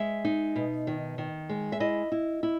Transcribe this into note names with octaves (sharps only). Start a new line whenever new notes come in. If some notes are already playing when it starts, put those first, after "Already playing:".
Already playing: G#3 E5
D#4
B2
D#3
D#3
G#3
E5
E4 D#5
E4
E4